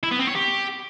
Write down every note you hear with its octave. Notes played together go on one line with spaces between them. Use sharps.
E4
B3
C4
C#5
G4